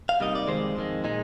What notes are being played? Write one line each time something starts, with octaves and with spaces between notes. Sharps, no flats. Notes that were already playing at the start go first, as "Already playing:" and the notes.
F5
C3 G3 A#3 D#4 D#5
D5
F2 D#3 G#3 C5
F2 D#3 G#3
A#2 G#3 D#4